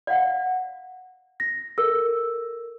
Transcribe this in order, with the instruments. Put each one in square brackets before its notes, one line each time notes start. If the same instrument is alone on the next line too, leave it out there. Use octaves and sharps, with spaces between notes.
[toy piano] D5 F5 F#5
[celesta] A#6
[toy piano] A4 [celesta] A#4 E6